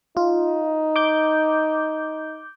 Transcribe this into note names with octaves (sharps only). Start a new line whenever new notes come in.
D#4 F4
D6 G6